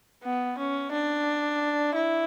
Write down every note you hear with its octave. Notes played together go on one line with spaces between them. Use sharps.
B3
C#4
D4
E4